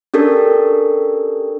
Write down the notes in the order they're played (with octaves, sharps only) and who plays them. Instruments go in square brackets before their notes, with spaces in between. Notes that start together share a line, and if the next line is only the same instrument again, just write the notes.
[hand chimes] C#4 D4 G4 A4 A#4